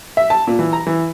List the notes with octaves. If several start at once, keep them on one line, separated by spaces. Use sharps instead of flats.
E5
A5
A#2
E3
A#5
E3